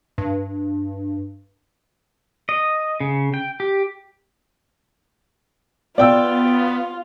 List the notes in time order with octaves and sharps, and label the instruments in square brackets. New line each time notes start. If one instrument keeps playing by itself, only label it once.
[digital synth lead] G2
[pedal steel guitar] D#5
C#3
G5
G4
[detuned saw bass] B3 [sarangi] F4 [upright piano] D5 G5 E6